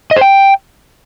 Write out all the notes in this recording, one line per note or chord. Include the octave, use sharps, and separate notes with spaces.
D#5
C5
G5